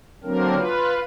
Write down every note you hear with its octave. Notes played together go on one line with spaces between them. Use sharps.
D3 F#3 A#3 C4 D4 A#4
F4 B4